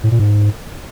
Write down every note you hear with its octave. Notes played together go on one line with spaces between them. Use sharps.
A2
A#2
G#2